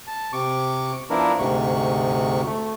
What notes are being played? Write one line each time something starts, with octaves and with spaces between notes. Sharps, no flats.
A5
C3 C#6 D6
F3 B3 D4 E4 A#4
D2 G#2 C3 C#6
A3